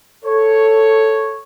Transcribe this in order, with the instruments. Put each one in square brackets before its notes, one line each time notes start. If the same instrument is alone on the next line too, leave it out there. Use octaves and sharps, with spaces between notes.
[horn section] A4 C#5